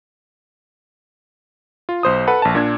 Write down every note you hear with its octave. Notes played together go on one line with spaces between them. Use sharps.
F4
B1 C5 D#6
A4 B4 F#5
A#1 A5
A#2 D4 G#6